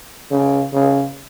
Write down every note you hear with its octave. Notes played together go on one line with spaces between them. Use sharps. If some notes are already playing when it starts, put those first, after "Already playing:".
C#3
C#3